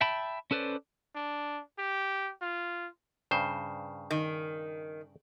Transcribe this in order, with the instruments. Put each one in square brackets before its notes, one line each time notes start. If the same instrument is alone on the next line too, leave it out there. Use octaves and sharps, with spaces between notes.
[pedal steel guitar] E5 G5 A5 B5
C#4 A4 B4 C5 D5
[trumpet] D4
G4
F4
[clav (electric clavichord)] G2 C#3 C5
[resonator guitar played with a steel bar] D#3